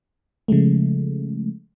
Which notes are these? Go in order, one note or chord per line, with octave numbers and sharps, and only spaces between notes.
C#3 F3 G#3 A3